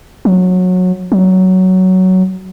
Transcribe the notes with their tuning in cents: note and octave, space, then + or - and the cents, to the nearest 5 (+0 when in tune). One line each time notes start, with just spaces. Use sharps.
F#3 -20
F#3 +10